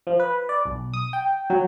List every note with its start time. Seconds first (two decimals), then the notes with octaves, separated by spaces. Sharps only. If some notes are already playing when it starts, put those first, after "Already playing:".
0.07 F3
0.20 B4
0.49 D5
0.65 B1
0.94 D#6
1.13 G5
1.50 F#3